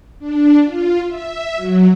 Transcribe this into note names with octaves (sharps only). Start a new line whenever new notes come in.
D4
F4
E5
F#3